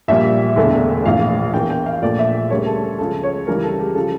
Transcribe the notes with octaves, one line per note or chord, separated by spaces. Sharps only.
A#1 A#2 G3 E5
E1 E2 D3 A3
A#1 A2 E3 F5
E2 E3 A#3 G5
G5
F5
A#1 A#2 A3 D5
E5
D2 C#3 G3 A#3 C#5
A4
A4
C#2 C#3 F3 A4
C#5
C#2 C#3 E3 G3 A#4
A4
G4
C#3 F3 A4